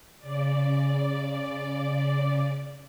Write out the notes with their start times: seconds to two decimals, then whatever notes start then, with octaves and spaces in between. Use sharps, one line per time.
0.19 C#3 D5